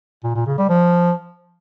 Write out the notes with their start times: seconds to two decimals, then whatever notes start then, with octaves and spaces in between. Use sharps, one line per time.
0.24 A#2
0.35 A#2
0.47 C#3
0.58 G3
0.69 F3